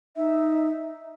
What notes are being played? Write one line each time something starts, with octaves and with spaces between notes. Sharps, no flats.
D#4 E5